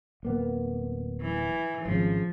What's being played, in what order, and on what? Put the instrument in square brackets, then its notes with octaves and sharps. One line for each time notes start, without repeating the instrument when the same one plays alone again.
[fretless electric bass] D1 A#3 B3
[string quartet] E3
[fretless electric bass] G#1 C#3 [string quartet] F3